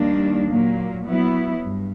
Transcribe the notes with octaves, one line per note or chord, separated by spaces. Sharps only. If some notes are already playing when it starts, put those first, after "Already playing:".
Already playing: D#2 D#3 G3 A#3 D4
A#2 F#3 A#3
F#3 B3 E4
G2